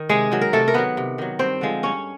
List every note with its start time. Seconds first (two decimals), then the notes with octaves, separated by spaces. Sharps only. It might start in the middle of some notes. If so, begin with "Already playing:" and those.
Already playing: D#3
0.09 C3 G#3 G#4
0.32 D#3 F#3
0.41 A#4
0.53 C3 A3 A4
0.68 A#4
0.74 D#3 F#3 B3 B4
0.97 C3
1.18 D#3 F#3
1.39 G2 C4 C5
1.61 D3 F3 G#3
1.83 G2 C#4 C#5